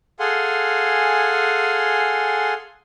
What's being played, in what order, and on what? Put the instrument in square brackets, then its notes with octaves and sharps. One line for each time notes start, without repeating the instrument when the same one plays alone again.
[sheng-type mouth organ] G#4 A4 F5 F#5 G#5 C6